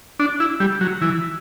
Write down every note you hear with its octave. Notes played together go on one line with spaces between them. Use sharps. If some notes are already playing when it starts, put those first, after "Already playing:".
D4
E4
G3
F#3
E3